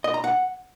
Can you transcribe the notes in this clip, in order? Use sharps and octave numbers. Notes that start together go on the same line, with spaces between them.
D#5
A#5
F#5